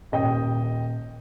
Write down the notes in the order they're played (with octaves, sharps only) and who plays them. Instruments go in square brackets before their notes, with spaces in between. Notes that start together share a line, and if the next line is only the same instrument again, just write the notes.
[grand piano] D#1 D#5 G5